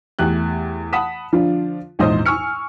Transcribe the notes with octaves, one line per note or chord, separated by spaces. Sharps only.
E2 A3 G4 F#6
F#5 A5 B5 D#6 B6 E7
D3 F3 D4 F4
A#1 E2 G#2 C5 D#5 D#6
G#5 C#6 E6 F6 C#7